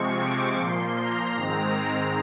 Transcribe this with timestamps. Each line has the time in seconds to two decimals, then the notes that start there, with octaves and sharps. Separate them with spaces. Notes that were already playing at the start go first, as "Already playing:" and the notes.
Already playing: C3 F3 G#3 C4 C#6
0.19 D6
0.58 A#2 F3 A#3 C6
0.97 A#5
1.35 G#2 D#3 G#3 C4 A#5